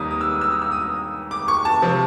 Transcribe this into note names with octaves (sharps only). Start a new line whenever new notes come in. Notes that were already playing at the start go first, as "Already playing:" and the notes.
Already playing: D#2 D#3 G3 A#3 D#6
D#6
E6
D#6
E6
D#6
E6
D#6
D6
C#6
A5
C3 F3